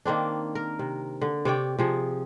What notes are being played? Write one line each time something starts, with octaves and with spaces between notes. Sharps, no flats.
D#3 A#3 C4 D4
A#4
C3
D3
C3 C#5 D5 G5
C3 F3 G#4